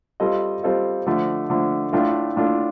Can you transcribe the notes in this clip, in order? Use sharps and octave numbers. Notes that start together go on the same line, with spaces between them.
G3 C4 F4 A4 D#5
G3 C4 F4 A4 D#5
D3 F3 A3
D3 F3 A3
A2 A3 D4 F4 A4
A2 A3 D4 F4 A4